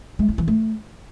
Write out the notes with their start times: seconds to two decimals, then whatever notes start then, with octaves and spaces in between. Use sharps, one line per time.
0.19 G#3
0.29 E4
0.38 E3
0.48 A3